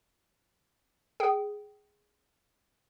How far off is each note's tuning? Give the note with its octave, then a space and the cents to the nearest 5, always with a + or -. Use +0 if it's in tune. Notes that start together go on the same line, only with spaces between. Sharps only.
G#4 +0 G5 -25